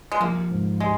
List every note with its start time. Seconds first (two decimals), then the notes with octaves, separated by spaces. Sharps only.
0.12 G#3
0.20 F3 A#3
0.51 G#2
0.80 G3 G#3